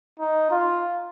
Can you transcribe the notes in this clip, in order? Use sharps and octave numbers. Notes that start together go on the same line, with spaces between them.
D#4
F4